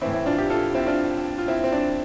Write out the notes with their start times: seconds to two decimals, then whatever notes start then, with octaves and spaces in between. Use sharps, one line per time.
0.01 E3 C4 E4
0.05 A2
0.13 C4 E4
0.26 D4 F4
0.38 E4 G4
0.50 F4 A4
0.74 C4 E4
0.87 D4 F4
1.38 F4
1.48 C4 E4
1.64 C4
1.72 D4